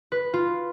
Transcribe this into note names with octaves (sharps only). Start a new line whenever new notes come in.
B4
F4